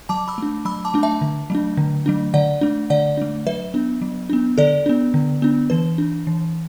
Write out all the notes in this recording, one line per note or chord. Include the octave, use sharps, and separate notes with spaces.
F#3 A5 D6
B5 E6
A3 D4
F#3 B5 E6
A5 D6
A3 D4
E5 A5
D3
F#3 A3 D4
D3
F#3 A3 D4
D3 D5 F#5
A3 D4
D3 D5 F#5
A3 D4
F#3 B4 E5
B3 D4
F#3
B3 D4
D3 A4 D5
B3 D4
D3
B3 D4
E3 B4
D4
E3